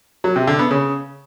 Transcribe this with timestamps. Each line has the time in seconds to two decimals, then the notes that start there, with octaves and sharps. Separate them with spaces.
0.24 F#3
0.36 C3
0.47 D3
0.59 B3
0.71 C#3